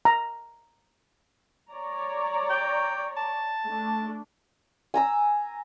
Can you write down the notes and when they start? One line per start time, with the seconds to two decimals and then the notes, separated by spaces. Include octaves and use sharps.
0.05 A#5
1.71 C#5 D5 A#5
2.50 G5
3.17 A5
3.65 A3 D4
4.94 G#5 A#5 E6